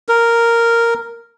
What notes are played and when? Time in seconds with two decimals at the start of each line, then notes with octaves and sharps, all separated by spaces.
0.09 A#4